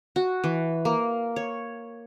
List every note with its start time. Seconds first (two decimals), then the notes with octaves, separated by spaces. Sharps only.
0.16 F#4
0.44 E3
0.85 A#3
1.36 C#5